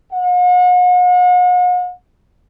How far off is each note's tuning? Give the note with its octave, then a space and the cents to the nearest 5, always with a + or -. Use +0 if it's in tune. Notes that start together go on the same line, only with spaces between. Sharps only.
F#5 -45